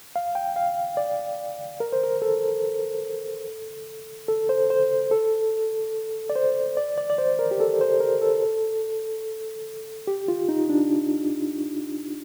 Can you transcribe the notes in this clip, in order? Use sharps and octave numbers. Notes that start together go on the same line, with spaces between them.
F5
G5
F5
D5
A#4
C5
A#4
A4
A4
C5
C5
A4
D5
C5
D5
D5
D5
C5
A#4
G4
A4
C5
A#4
A4
G4
F4
D#4
D4